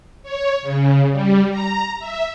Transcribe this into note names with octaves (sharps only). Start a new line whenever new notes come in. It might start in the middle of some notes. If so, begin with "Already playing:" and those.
C#5
C#3
G3
A#5
E5